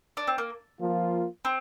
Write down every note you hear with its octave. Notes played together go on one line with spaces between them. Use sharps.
D4
C4
A#3
F3 A#3 F4
C4